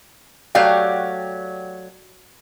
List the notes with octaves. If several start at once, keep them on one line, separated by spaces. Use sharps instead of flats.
F#3 A3 G4 D5 F5